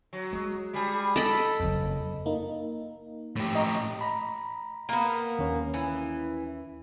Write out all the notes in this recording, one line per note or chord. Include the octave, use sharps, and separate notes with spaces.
F#3
G#3
G3 G#4
A4 D#5 B5
F#1 F2
A#3 D#4
A2 G4
D#5 A#5 C#6
A#5 B5
A#3 B3
D#2 C#4
E3